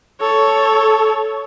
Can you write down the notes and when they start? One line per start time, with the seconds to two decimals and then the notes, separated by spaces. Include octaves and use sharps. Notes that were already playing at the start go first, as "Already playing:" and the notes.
0.21 A4 C#5